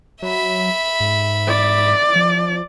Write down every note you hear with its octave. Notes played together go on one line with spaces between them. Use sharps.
F#3 E5 B5
G#2
D5
F3